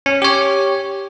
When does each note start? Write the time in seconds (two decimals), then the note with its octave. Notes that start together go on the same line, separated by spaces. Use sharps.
0.06 C#4
0.22 G4 C#5